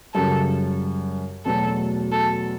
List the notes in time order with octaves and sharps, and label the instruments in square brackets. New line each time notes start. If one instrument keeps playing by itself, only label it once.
[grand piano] F#2 C#3 G3 [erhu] A4
[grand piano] E2 B2 F#3 A3 [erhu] A4
[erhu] A4